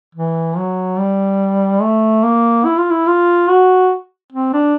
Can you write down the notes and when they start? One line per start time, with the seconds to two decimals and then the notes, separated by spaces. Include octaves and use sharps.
0.15 E3
0.57 F#3
0.99 G3
1.81 A3
2.24 A#3
2.65 E4
2.78 F4
2.91 E4
3.07 F4
3.48 F#4
4.32 C4
4.53 D4